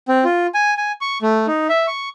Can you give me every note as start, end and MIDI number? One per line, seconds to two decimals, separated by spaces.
0.08 0.24 60
0.24 0.47 65
0.54 0.74 80
0.77 0.92 80
1.01 1.18 85
1.22 1.46 57
1.47 1.67 63
1.69 1.86 76
1.87 2.09 85